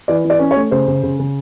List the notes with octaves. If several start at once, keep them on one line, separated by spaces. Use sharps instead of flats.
E3 D5
E3
D5
C#4
C#5
A3
C#3 C5
C#3
C#3
C#3